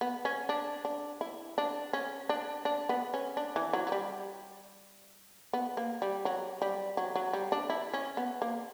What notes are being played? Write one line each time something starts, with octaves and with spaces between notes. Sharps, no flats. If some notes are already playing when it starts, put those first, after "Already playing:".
B3
C#4
D4
D4
E4
D4
C#4
D4
D4
B3
C#4
D4
E3
F#3
F#3
G3
B3
A#3
G3
F#3
G3
F#3
F#3
G3
D4
E4
C#4
B3
A#3